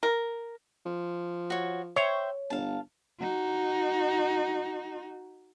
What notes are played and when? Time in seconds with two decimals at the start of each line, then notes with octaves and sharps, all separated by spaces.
0.03 A#4
0.85 F3
1.50 F#4 C#5
1.96 C5 C#5 E5 G5
2.50 G1 F5 A5
3.20 D#4 F#4